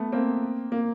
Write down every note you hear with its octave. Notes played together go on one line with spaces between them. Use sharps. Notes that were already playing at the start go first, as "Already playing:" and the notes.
Already playing: A3 B3
A#3 C4
A#3